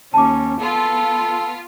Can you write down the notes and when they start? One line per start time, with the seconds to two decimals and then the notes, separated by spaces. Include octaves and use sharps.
0.14 D#2 C#4 A5 D6
0.61 B3 F4 A4